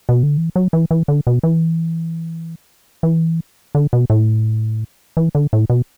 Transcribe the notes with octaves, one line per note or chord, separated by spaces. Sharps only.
B2
D3
E3
F#3
E3
E3
D3
B2
E3
E3
D3
B2
A2
E3
D3
A2
B2